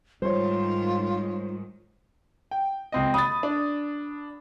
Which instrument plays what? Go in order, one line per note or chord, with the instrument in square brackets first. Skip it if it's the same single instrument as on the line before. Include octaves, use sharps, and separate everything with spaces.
[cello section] G#2 D#3 [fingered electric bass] G3 [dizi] F4 [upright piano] C5 C#5
[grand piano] G5
C#2 C4 D#5
[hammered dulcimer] B5 [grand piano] D#6 A6
[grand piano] D4